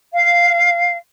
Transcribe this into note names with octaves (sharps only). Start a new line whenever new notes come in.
F5